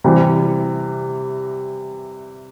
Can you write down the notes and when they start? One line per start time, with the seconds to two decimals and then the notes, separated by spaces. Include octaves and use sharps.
0.04 C3 E3 G3